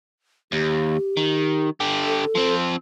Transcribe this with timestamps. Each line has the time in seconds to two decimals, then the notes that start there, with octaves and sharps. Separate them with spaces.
0.52 D#2 G4
1.17 D#3
1.80 D3 G4
2.07 A4
2.35 F3 C4